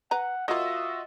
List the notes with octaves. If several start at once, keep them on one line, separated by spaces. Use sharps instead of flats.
B4 F#5 A#5
F#3 A#3 F4 F#4 D#5 E5